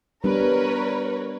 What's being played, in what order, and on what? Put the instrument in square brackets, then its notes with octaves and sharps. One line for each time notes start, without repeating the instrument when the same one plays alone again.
[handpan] G3 B3 D4 [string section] A#4 B4 C#5